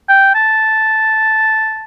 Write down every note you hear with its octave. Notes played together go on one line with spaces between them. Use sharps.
G5
A5